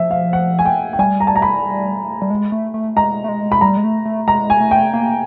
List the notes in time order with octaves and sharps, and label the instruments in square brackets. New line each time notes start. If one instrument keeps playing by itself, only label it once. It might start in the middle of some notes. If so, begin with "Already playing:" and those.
Already playing: [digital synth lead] F3 [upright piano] E5
[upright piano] F5
F#5
G#5
G5
G5
[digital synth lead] G3 [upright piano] G#5
[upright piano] A#5
A5
A#5
B5
[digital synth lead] G3
G#3
A3
A3
[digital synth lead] G#3 [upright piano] A#5
[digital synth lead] A3
G#3
[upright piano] B5
[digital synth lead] G3 [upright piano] A#5
[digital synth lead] G#3
A3
A3
[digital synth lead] G#3 [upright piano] A#5
[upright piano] G#5
[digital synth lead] A3
[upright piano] G5
[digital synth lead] A#3